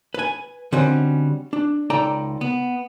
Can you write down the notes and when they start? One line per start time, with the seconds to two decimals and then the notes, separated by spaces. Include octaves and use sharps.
0.14 B4 G#5
0.72 D3 G3 C4 C#4 F#4 D#5
1.53 D4
1.90 C#2 D#4 A4 D5 G5 A#5
2.41 B3